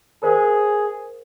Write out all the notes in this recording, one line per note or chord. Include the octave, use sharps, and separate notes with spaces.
G#4 A#4 C5 F5